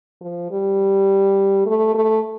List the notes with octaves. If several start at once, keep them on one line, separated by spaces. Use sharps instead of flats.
F3
G3
A3
A3